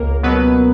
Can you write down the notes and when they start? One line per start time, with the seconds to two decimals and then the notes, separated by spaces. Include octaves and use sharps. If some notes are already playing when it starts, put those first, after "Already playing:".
Already playing: C#2 A#3 A#4
0.23 B2 F#3 B3 B4